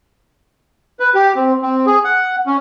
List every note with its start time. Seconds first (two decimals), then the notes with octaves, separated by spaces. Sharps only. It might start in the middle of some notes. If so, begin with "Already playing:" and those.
1.00 B4
1.15 G4
1.36 C4
1.62 C4
1.87 G#4
2.05 F#5
2.46 C#4